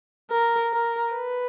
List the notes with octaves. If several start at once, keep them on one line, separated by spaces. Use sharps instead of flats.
A#4
A#4
B4